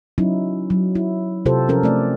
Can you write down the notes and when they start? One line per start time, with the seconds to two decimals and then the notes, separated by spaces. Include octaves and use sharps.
0.18 F#3 C#4 D#4 E4
0.70 F#3
0.95 E4
1.46 C3 F4 G4 A4 C5
1.68 F3 C#4 A4 A#4
1.83 A3 C4 D5